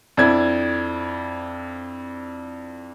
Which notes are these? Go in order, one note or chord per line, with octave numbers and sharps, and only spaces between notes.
F2 D4 E4 G#6